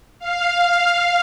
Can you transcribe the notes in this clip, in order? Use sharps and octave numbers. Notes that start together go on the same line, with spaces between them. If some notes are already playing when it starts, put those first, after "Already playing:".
F5
F5